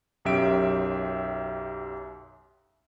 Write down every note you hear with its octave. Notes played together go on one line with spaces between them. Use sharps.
B1 F#2 G4 E5 D7